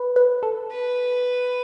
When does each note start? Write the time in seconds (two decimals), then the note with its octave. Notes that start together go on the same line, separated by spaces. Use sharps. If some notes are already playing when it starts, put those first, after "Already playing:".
Already playing: B4
0.16 B4
0.43 A4
0.71 B4